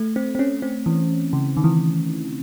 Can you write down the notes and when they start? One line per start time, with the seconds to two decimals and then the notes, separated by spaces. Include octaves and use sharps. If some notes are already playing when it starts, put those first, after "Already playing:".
Already playing: A3
0.16 C4
0.35 C4
0.39 C#4
0.62 C4
0.86 E3
1.33 C#3
1.57 D#3
1.64 E3